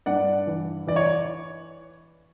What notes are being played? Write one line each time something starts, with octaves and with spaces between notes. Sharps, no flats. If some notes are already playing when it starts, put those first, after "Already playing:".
G2 D5 F#5
E3
E3 D5
C#5